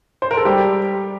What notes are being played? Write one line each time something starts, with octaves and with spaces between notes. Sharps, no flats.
C5
A#4
A4
G3 G4